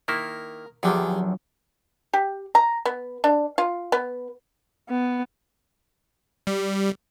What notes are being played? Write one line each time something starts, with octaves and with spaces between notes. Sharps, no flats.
D#3 A#3 E4 A#4
E2 D3 D#3 F3 F#3 D4 G4 G#4
G4
A#5
B3
D4
F4
B3
B3
G3